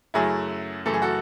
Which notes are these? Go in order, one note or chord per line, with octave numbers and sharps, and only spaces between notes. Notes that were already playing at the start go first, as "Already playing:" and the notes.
F#2 C#3 F#3 A3 E4 G#4
F#2 C#3 E3 A3 A4
G#4
F#4 A4